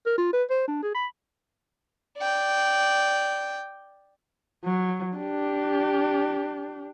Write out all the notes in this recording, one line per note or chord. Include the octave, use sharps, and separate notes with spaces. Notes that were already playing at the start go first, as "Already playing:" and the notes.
A#4
F4
B4
C5
D4
G#4
B5
D5 G5
F#3
D4 G4